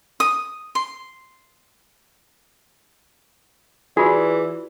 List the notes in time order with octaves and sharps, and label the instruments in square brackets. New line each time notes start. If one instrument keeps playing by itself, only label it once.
[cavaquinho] D#6
C6
[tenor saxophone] E3 [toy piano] F4 F#4 [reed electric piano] G#4 [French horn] D5